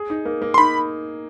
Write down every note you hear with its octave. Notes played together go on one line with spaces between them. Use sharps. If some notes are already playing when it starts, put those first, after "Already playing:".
Already playing: G#4
D#4
A#3
A#3
C6
D#4 B5